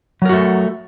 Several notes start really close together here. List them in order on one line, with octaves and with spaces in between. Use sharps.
F#3 A#4 F#4 A3